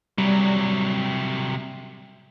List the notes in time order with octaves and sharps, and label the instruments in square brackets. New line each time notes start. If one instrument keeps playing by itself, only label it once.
[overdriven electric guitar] C3 F#3 [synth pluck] G3